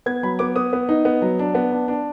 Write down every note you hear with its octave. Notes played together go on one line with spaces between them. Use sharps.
B3 G#6
F#3 B5
B3 D6
B3 D#6
B3
D#4
B3
F#3
D4
B3
D4
D4